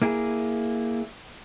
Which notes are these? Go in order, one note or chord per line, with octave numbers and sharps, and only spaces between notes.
A#3 E4 G#4